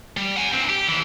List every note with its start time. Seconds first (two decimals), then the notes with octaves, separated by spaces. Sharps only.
0.17 G3
0.37 F#5 G#5
0.54 G2 C4
0.70 G4
0.88 D#2 E3